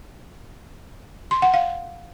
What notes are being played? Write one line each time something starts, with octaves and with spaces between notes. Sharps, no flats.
C6
F#5
F5